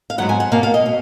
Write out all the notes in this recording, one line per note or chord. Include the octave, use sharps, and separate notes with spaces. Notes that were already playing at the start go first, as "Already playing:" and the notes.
F5
G#2 F#3 B3 F#5
G#5
F#5
B2 A#3 F5
F5
D#5
B2